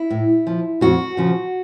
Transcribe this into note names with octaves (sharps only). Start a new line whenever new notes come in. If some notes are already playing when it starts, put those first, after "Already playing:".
Already playing: E4
A2
F3
F2 F#4
C#3 F3